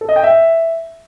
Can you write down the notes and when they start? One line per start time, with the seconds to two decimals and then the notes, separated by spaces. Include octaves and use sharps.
0.01 A4
0.09 D#5
0.16 G5
0.24 E5